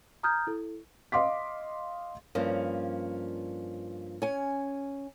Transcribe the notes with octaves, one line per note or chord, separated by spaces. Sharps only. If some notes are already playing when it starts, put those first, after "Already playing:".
A#5 D#6 F6 G6 G#6
E4 A4
D#5 F5 C6 D6 B6
G2 F3 A#3 C#4
C#4 G#5